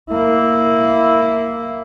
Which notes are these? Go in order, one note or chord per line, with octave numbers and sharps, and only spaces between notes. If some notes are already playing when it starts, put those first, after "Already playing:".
A#3 E4